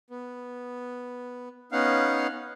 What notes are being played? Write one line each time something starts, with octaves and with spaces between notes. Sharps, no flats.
B3
B3 C#4 D#4 F5 F#5